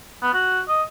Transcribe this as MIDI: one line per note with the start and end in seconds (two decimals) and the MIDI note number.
0.22 0.29 59
0.33 0.61 66
0.68 0.83 75